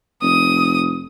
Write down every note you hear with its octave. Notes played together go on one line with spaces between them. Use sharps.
F1 D#6